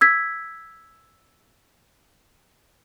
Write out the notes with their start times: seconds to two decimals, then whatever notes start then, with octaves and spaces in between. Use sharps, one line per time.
0.01 E6 G#6 B6